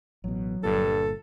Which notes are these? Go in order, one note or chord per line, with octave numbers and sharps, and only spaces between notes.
A1 B2 F#3
G1 G2 A#2 A4